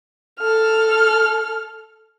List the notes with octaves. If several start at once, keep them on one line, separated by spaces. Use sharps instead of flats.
A4 F6